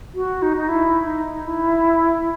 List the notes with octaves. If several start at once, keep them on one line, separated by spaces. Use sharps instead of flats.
F#4
D#4
D#4
E4
D#4
E4